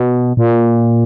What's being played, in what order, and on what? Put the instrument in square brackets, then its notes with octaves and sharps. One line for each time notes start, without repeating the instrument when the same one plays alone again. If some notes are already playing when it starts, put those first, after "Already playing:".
Already playing: [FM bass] B2
A#2